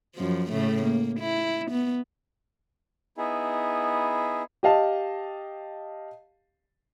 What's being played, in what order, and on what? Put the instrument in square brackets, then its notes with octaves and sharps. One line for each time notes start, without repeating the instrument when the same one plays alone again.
[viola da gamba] F#2 F3
A2 C#3 A3
A#3
E4
B3
[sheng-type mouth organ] B3 D#4 E4 G#4
[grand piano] G4 D#5 F5 A5